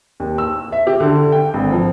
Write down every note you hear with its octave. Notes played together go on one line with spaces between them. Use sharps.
D#2
E6
E5
G4
D3
G5
G#1
F3